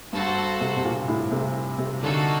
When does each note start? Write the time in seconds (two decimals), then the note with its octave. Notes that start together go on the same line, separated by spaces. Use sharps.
0.13 G2 F#4 A4 C5
0.60 C3
0.77 C3
0.84 A#2
1.08 A2
1.32 C3
1.78 C3
2.02 D3 A#3 D#4 F#4 A4